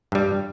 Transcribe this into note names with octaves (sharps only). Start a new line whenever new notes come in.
G2 G3